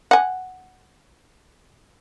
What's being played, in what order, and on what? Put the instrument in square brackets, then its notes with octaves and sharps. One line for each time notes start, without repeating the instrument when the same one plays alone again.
[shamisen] F#5 G#5